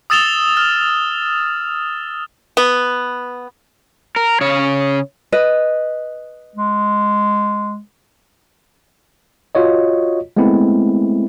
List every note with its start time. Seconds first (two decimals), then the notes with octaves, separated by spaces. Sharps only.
0.10 D#6 E6 A6 E7 F7 G7
0.57 F6
2.57 B3
4.16 A#4
4.41 C#3 C#5
5.32 B4 D#5
6.55 G#3
9.55 F4 F#4 C#5 D#5
10.37 G#3 A3 B3 C4 E4